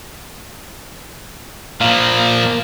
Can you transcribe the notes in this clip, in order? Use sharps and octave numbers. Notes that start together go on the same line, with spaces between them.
A#2 F3 A#4 F5